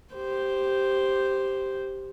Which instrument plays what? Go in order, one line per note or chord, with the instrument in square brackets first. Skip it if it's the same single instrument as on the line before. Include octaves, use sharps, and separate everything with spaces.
[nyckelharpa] G4 C5